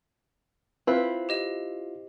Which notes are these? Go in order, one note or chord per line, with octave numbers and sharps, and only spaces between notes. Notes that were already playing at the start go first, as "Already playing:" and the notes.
C4 E4 F4 B4
G4 D#5 E7